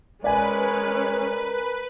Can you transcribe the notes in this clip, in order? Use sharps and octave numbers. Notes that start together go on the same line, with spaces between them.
G#3 C#4 A#4 B4 D5 G#5